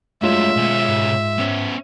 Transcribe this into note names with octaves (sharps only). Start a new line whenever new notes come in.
G2 F#3 G#3 A3 F4 C#5 E5 E7
B2 C#4
G#2
B3 C#4